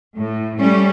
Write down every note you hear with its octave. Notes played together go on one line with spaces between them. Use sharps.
A2
G3 A3 C#4